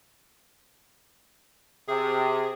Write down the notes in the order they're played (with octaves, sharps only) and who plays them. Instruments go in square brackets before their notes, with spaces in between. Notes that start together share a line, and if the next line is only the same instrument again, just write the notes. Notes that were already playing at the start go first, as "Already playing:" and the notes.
[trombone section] C3 [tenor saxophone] G#4